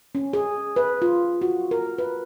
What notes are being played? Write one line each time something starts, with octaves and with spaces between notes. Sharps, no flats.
C#4
G#4
B4
F4
F#4
A#4
B4